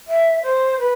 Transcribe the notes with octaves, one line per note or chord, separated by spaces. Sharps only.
E5
C5
B4